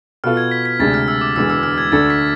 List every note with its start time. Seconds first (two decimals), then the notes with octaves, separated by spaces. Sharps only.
0.24 B2 B3 F4 A4 F6
0.37 G#6
0.51 B6
0.65 B6
0.79 D2 C3 G#3 D4 A6
0.94 F6
1.08 E6
1.21 D6
1.35 E1 E2 D3 G#3 E6
1.50 E6
1.63 F6
1.78 G#6
1.92 D2 D3 A3 D4 A4 A6
2.10 B6